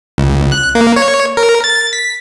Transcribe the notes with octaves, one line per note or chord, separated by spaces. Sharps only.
C#2
F#6
A#3
C#5
A#4
A6
B6